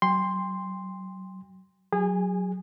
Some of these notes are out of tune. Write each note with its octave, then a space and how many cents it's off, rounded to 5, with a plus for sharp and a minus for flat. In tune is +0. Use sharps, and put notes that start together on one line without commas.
F#3 +30 G5 +35 C6 +0
F#3 +0 G#4 -30 G#5 +0